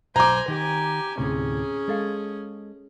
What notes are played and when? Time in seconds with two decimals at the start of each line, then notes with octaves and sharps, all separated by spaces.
0.16 B1 C5 G#5 A#5 D6
0.48 D#3 G4 G#5
1.18 D2 A2 C3 C#4 G#4
1.88 G#3 A4 F5